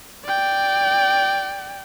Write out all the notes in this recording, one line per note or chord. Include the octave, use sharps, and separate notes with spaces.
D5 G5